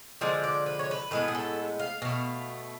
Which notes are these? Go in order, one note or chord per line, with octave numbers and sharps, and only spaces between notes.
D3 F3 G#3 D5
D5
B4
C#5
B4
A2 G#3 B3 B4
G#4
A4
F5
B2 A3 F5